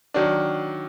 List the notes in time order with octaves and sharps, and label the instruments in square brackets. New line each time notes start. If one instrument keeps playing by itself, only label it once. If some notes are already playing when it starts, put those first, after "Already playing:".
[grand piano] D#3 F#3 D4